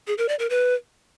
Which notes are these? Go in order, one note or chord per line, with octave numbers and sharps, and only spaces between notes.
G#4
A#4
D5
A#4
B4